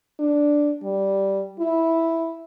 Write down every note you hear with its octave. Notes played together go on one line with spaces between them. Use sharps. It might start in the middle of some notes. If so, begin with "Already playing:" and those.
D4
G3
E4